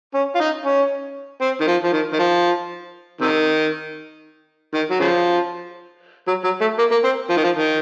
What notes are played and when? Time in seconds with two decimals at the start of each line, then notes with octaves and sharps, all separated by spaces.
0.14 C#4
0.35 F4
0.40 D#4
0.65 C#4
1.41 C4
1.61 D#3
1.67 F3
1.84 F3
1.93 D#3
2.13 D#3
2.19 F3
3.21 C3 D#3
4.74 D#3
4.91 F#3
5.00 C#3 F3
6.28 F#3
6.44 F#3
6.61 A3
6.79 A#3
6.91 A#3
7.04 C4
7.30 F3
7.37 D#3
7.44 F3
7.55 D#3